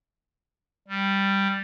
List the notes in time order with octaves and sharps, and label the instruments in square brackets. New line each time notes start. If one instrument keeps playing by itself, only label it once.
[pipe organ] G3